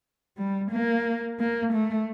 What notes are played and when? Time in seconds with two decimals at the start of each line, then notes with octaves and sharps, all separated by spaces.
0.38 G3
0.71 A#3
1.39 A#3
1.73 A3